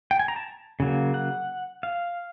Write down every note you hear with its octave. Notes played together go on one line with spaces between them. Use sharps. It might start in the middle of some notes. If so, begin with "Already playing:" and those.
G5
G#5
A#5
A5
C#3 F#3 A#3
F#5
F5